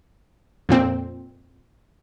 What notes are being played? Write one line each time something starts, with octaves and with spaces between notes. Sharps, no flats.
F2 A#2 C4